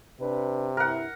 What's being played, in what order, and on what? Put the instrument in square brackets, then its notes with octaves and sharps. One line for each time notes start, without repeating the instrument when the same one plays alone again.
[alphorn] C3 [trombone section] D4 B4
[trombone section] G2 E4 [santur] A#4 F#5